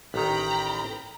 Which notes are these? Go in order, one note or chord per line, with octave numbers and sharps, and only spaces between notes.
A1 D#3 G5 A#5 B5